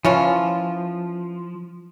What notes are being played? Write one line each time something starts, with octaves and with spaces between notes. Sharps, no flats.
E3 F3 C#4 F4